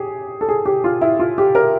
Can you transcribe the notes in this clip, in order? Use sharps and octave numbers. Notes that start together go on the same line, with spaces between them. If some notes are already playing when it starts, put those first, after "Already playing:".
Already playing: G4 G#4
A4
G#4
G4
F4
E4
F4
G4
A#4